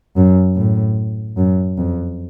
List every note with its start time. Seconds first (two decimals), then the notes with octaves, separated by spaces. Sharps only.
0.16 F#2
0.56 A2
1.37 F#2
1.78 F2